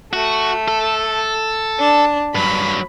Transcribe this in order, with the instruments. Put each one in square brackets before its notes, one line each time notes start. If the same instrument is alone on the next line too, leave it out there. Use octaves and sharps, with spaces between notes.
[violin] A3 [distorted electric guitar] F#4
[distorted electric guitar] A4
[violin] D4
[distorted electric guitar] G2 F#3 [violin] B5